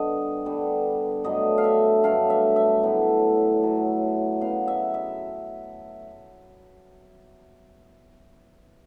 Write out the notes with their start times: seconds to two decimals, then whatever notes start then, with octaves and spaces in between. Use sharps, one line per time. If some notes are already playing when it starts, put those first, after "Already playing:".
Already playing: G2 D3 G3 B3 D#5
0.45 G2 D3 G3 B3
1.24 G2 D3 F#3 A3 D#5
1.58 F5
1.64 E5
2.04 G2 D3 F#3 A3 F5
2.30 E5
2.56 E5
2.83 A2 F#3 B3
3.62 A2 F#3 B3
4.41 C#3 F#3 B3 F5
4.68 E5
4.94 E5